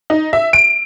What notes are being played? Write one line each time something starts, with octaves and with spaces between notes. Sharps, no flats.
D#4
E5
D7